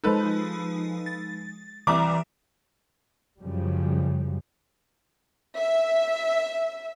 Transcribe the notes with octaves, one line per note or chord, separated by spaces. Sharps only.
F3 G#3 D#4 A4 B4
A6
C2 E3 D5 E5 A#5 D6
F#2 C#3 F3 G3
E5